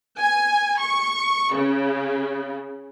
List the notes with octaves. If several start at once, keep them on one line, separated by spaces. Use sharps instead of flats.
G#5
C#6
C#3